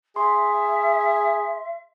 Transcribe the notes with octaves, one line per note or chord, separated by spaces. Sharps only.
G#4 E5 C6